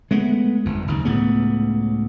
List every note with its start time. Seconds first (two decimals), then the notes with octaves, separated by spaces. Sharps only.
0.11 G#3 A3 B3
0.65 G1 F2
0.88 F#1 D#2
1.05 C#2 A2 C#3 B3